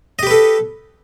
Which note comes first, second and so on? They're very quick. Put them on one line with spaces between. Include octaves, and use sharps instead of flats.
D#5 G4 B4 A4